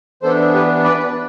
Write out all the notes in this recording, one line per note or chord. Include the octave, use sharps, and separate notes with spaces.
E3 B3 D4 A4 C5
G4 B4
B4 D5